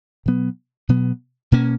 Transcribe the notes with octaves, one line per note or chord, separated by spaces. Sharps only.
B2 F#3 B3
B2 F#3 B3
B2 A#3 C#4